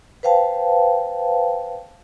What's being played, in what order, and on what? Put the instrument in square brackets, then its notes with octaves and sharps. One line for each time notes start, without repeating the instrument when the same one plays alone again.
[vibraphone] B4 C5 F5 G5 A5